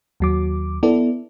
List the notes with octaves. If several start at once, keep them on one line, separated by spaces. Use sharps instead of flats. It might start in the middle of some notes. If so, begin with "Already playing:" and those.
D#2 F#3 D6
B3 E4 A4 D5